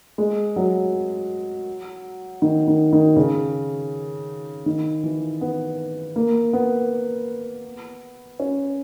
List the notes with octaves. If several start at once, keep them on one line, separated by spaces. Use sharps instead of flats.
G#3
F#3
D#3
D#3
D#3
C#3
D#3
E3
B3
A#3
B3
C#4